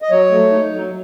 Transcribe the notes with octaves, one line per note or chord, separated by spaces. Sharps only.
D#5
F#3 C#5
A3
D#4
F#3